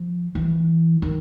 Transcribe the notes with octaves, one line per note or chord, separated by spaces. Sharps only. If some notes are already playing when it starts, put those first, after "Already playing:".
Already playing: F3
E3
D#3